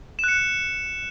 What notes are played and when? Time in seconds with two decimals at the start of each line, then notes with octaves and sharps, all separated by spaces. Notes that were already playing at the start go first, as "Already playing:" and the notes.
0.19 E7
0.24 F#6
0.28 C#7